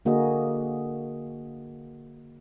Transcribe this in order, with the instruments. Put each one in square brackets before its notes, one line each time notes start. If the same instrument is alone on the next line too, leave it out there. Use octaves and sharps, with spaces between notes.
[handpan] D3 A#3 F#4 G#4 D#5